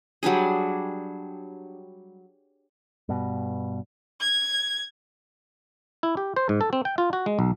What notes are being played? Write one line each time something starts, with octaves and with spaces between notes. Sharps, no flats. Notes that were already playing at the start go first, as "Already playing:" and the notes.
F#3 G3 D4 G#4
G2 B2
G#6
E4
G4
C5
G#2
A4
C4
G5
F4
F#4
G#3
B1